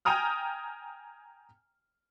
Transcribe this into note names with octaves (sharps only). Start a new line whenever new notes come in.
G5 G#5 A#5 D#6 F6